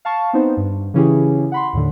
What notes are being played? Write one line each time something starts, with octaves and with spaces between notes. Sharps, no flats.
F5 A5 C#6
B3 C4 D#4 C5
G2
C#3 E3 C#4 E4 G4 G#4
F#5 B5 C6
D#2 A2 D3